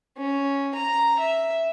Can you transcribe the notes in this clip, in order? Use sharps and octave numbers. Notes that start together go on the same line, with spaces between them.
C#4
A#5
E5